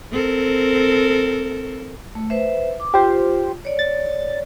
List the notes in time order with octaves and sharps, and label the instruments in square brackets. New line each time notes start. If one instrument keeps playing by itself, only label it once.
[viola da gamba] C4 A4 A#4
[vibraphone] A3
B4 C5 E5
D6
[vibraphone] F4 [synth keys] G4 C5
[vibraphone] C#5 D5
[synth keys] A6